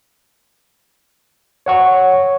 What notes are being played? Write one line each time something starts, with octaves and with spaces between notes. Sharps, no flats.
C#5 F#5 C#6